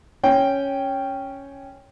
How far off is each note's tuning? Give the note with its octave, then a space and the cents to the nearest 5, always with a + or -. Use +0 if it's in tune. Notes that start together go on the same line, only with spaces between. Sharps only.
C#4 +0 G5 +0